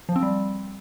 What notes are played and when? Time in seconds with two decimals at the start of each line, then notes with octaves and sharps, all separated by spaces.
0.09 F3
0.16 C4
0.23 G3